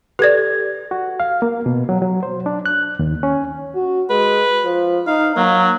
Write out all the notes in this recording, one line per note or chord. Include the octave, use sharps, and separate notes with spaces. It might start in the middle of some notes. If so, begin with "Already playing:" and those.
G4 A4 B4 D5 G#6
F#4
F5
A#3
B2
F#3
F#3
C5
D4
F#6
D#2
C#4
F#4
G#3 B4
F3
D#4 F5
F#3 A#3